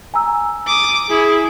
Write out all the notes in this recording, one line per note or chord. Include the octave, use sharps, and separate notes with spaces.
G#5 A#5 E6
D6 D#6
E4 G#4